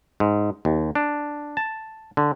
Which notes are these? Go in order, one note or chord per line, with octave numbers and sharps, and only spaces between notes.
G#2
D#2
D4
A5
D3